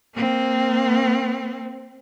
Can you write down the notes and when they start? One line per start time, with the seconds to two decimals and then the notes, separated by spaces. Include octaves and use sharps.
0.14 A#3 C4